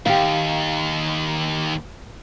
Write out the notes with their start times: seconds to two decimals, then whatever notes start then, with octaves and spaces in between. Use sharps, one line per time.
0.06 D#2 G4 F5